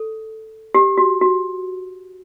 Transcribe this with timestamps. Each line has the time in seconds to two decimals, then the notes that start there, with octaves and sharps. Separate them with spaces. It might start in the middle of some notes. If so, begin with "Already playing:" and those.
Already playing: A4
0.75 G4
0.98 F#4
1.21 F#4